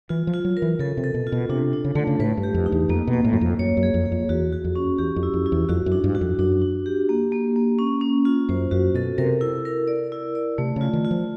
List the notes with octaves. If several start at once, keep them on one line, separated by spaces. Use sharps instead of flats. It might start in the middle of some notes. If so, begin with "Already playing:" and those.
E3 F4
F3
F4
F#3
A#4
E3
C#3 A4
C3
A4
B2
F4
B2
C3 D4
D4
C#3
D3 A3
C#3
A2 B4
G2
G4
F2
D#4
E2
F2 A#3
B2
A#3
A2
F#2
F2 A#3
F#2 C#5
F#2
G#4
F2
G#4
F2
E2 F#4
F#4
F2
C#4
E2 G4
F2
E4
F2
E4
E2
F2 F#4
F#2
D4
G2
F#4
F2
F#2 D4
D4
G4
A#3
A#3
A#3
C#4
C#4
F4
F#2 C5
F#2 F#4
B2 A4
C3 A#4
E4
A#4
D5
E4
D5
C3 A3
C#3 F4
D#3
F4
F3